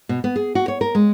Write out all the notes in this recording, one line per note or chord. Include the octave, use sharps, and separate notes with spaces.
B2
B3
G#4
F#4
C#5
A#4
G#3